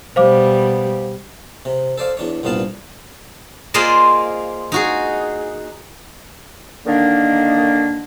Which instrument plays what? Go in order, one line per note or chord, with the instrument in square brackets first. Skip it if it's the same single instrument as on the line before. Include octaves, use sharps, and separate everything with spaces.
[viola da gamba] B2 G3 [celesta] C5 F5 D6
[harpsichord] C3
A4 C5 D5 F5
E2 D4 C#5
C2 G2 A#2 B3 F5 A5
[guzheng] A#3 F4 G#4 C5 D5 D#5
D#4 F#4 G#4
[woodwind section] D3 D#3 A#3 D4